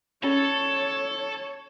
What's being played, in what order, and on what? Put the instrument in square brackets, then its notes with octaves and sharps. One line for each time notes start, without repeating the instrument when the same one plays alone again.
[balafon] C#4 [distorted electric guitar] A4 [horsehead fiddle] C#5